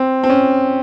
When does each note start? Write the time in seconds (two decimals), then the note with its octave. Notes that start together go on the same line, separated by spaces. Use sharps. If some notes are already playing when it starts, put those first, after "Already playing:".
Already playing: C4
0.24 C4
0.30 C#4